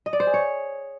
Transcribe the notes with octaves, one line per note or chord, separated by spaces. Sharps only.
D#5
D5
C5
G#4
C#5